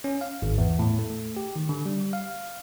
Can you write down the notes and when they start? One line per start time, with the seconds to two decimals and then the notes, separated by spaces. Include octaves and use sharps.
0.04 C#4
0.21 F5
0.42 G#1
0.58 E2
0.79 A2
0.99 A3
1.37 G4
1.56 D#3
1.69 D3
1.86 G3
2.13 F5